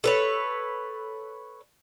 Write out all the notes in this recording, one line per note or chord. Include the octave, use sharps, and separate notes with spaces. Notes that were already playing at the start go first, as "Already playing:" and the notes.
A4 B4 C#5